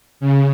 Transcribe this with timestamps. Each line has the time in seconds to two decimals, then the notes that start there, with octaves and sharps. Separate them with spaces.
0.20 C#3